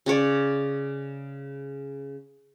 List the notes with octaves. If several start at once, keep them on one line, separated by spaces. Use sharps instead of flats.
C#3 C#4 C#5 D5